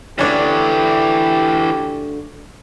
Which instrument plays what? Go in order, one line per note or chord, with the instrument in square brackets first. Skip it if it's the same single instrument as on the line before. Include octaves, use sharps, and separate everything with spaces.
[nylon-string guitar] D2 D3 D5 [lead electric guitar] E3 C#5 [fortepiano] C#4 D4 [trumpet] G4